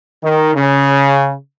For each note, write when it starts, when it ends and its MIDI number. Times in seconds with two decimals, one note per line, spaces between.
0.23 0.52 51
0.55 1.33 49